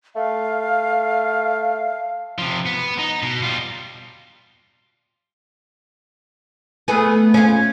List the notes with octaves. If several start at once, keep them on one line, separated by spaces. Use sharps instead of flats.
A3 F5
C3 F3
B3
D#4
B2
G3 F4
A3 B3 G#4
C#4 F4